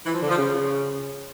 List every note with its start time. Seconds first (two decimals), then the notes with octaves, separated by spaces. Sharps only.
0.06 E3
0.14 F3
0.22 D3
0.29 F3
0.37 C#3